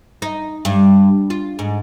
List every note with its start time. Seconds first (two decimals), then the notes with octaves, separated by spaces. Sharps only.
0.22 D#4
0.65 G2
1.30 F4
1.59 G#2